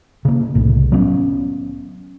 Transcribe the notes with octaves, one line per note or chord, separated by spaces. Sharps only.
C#3 A#3
C2 A2
F#3 B3 C#4